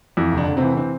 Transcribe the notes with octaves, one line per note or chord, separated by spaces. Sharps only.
F2 E3 E4
F1
D3 D4
F1
C3 C4
E3
C3 C4